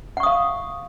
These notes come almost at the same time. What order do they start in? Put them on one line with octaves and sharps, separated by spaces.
F#5 C#6 D#6 F5